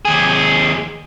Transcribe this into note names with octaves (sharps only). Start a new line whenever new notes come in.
D#2 G#4